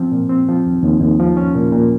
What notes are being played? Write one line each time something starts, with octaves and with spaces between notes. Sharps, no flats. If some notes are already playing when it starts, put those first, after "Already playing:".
Already playing: F3 C4
A#2
C4
F3
D#2
D#2
D#2
F3
C#4
A#2
A#2